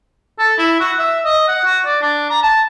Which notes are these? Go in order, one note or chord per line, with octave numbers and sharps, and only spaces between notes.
A4
E4
F#4
E5
D#5
F#5
F#4
D5
D4
A#5
A5